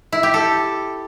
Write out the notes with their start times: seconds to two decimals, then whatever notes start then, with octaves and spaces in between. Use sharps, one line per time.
0.12 E4
0.23 G4
0.34 A4